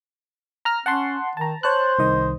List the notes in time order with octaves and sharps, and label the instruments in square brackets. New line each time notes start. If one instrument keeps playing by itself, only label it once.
[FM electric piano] A#5 F6
[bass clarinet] C#4 [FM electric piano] F#5 A5 C6
[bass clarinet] D#3 [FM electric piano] A5 A#5
[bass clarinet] C5 [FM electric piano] C#5 A5 F#6
[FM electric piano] C2 D#3 D#5